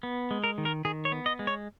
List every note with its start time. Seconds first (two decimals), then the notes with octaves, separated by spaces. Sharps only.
0.03 B3
0.31 G#3
0.44 A#4
0.58 D#3
0.65 A#4
0.85 D#3 G#4
1.05 C#5
1.12 B3
1.26 D#5
1.39 G#3
1.47 C#5